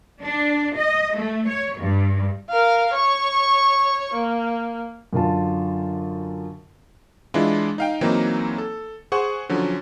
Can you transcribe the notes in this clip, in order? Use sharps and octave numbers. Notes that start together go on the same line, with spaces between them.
D4
D#5
A3
C#5
G2
A#4 F5
C#5 C#6
A#3
F#2 D3 F4 A5
E3 G#3 D4 E4 F4
D#4 F5 G5
E3 F#3 A#3 C4 D#4
A4
G#4 C5 F#5 C#6
D3 F3 F#3 C#4